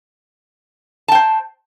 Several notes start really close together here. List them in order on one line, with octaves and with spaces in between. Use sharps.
A5 G5 C5